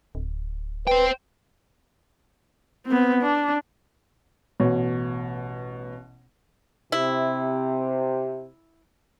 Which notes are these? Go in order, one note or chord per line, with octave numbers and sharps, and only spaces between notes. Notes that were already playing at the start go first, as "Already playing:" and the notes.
D1
B4 C5 G5
B3 C4
D4
A1 B2 C#5
C3 E4